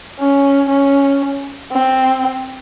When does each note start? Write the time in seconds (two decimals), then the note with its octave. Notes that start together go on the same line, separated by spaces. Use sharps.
0.19 C#4
0.69 C#4
1.72 C4